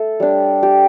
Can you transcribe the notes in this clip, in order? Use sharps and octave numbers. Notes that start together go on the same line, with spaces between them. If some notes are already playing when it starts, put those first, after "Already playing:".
Already playing: A3 A4
G3 D4
G4